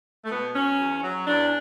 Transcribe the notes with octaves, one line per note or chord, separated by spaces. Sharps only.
A3
B2 B3
F#3 C#4
E2
F#3
E2 D4